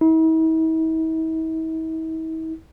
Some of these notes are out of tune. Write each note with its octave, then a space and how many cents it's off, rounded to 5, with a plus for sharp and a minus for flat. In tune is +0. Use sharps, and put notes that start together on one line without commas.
E4 -45